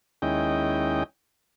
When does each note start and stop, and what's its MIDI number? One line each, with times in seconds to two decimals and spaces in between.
0.22 1.03 39
0.22 1.03 56
0.22 1.03 61
0.22 1.03 64
0.22 1.03 75
0.22 1.03 79